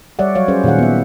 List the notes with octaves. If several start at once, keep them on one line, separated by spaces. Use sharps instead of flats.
G3 C#5 D5 E5 F#5
F#3 C#5 F5
C#4 G#4 B4 C5
A#2 D#3 G#4 F5 F#5
B3 E5